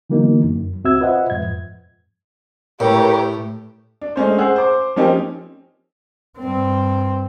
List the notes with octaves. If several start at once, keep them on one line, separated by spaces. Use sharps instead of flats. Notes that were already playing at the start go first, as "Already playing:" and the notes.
D3 E3 F#3 A#3 B3 D#4
F#2
C#2 C4 F#4 E5 E6 G#6
F4 B4 C5 D#5 E5 F#5
F2 G#2 G#6
A2 A3 G4 A#4 B4 C#5
D4
G#3 A3 C#4 C5
G#4 C5 F#5 E6
C5 D6
F3 A#3 C4 C#4 D#4 G4
G2 C4